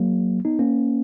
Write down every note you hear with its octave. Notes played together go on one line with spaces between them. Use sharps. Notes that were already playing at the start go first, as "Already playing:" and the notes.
Already playing: F#3 A#3
B3 D#4
A#3 C#4